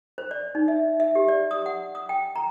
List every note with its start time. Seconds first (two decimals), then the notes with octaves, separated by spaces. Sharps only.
0.18 C5
0.31 D5
0.55 D#4
0.68 E5
1.00 E5
1.15 G4
1.28 D5
1.51 D#6
1.66 F#5
1.95 D#6
2.09 G5
2.36 A#5